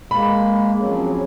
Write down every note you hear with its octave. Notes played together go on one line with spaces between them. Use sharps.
G#3 A#3 B5
F3 F#3 C4 C#4 G#4